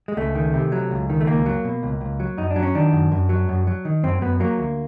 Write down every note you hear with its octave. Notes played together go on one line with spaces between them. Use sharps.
G#3
C#2 A3
D#3
C3
F#3
C#2
D#3
A3
C#2 A#3
F#3
B2
C#2
C#2
F#3
F#2 D#4
D4
F#3
C#4
D#3 D4
F#2
F#2
F#3
F#2
F#3
D#3
F#2 C4
F#2 B3
F#3 A#3
D2